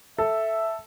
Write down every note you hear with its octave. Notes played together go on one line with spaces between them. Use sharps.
A4 E5